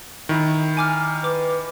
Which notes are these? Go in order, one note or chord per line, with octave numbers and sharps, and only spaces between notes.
D#3 E4
G#5 D6 F6
B4 D6